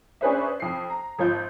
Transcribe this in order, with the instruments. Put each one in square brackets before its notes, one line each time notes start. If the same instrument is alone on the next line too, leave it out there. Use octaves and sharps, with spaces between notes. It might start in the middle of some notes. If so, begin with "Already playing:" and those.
[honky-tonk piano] C#4 D4 G#4 B4 C5 E5
F2 C7
A#5
G#1 F3 F4 G6